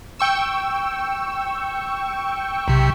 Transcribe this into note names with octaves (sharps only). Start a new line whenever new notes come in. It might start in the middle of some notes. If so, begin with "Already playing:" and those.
G5 C#6 E6
B1 C3